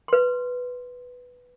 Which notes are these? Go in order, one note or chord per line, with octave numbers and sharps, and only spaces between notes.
B4 C6